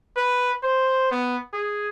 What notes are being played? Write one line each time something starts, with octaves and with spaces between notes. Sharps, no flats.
B4
C5
B3
G#4